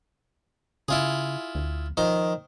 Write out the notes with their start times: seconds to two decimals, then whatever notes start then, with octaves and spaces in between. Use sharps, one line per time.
0.88 C#3 E4 F4 G#4
1.55 D2
1.97 D#3 F3 C5 C6